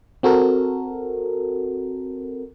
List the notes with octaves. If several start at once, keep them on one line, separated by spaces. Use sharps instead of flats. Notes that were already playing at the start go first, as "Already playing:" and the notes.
C4 F#4 A4 A#4